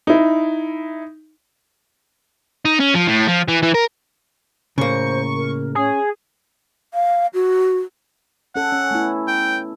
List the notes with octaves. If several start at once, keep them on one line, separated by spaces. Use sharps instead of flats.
D#4 E4
D#4
C#4
F3
A2
F3
E3
E3
A#4
A2 C#3 A#3 C5 C#6
A#4
C#4 G#4
F5
F#4
C#4 A4 F#5
C#4
A3 B3 E4
G5